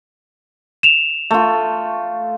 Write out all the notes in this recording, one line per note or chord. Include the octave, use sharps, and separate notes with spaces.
E7 F7
A3 F4